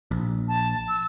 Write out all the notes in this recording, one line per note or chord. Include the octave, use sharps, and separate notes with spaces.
A#1
A5
E6